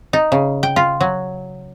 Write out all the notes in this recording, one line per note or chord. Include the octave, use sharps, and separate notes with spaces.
D#4
C#3
G5
F4
F#3